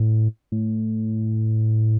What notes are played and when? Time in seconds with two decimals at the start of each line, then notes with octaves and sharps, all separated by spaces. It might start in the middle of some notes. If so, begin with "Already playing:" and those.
Already playing: A2
0.52 A2